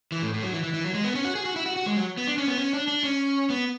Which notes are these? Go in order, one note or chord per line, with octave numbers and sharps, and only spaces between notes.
E3
A2
A2
F#3
E3
E3
E3
F#3
G#3
B3
C#4
F#4
G#4
F#4
E4
F#4
F#4
G#3
F#3
B3
D4
C#4
B3
C#4
D4
D4
C#4
B3